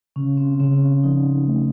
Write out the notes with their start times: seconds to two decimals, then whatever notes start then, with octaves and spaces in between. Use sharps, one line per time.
0.16 C#3 C#4
0.37 C4
0.60 C#3 C4
0.82 C#4
1.04 F3 D#4
1.33 C#4
1.48 A3